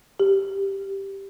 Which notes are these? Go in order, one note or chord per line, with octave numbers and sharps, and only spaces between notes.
G4